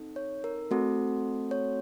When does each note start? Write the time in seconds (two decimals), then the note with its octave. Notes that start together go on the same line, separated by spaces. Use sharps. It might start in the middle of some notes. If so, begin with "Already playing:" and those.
Already playing: C4 D#4 A4
0.16 C#5
0.44 A#4
0.71 A3 C4 F#4 A4
1.51 C#5